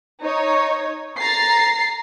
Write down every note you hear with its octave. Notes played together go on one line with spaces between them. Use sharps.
D#4 C#5
A#5 A6 C7